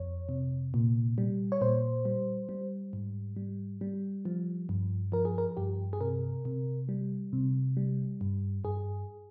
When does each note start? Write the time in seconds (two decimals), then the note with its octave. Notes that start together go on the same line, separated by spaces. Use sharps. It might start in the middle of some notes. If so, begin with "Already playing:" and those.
Already playing: F2 C#5
0.29 C3
0.74 A#2
1.18 G3
1.52 C#5
1.61 A#2 C5
2.05 G3
2.49 G3
2.93 G#2
3.36 G3
3.81 G3
4.25 F3
4.69 G2
5.12 F3 A#4
5.25 G#4
5.38 A#4
5.57 G2 G4
5.93 G#4
6.01 C3 A#4
6.45 C3
6.89 G3
7.33 C3
7.77 G3
8.21 G2
8.64 G2 G#4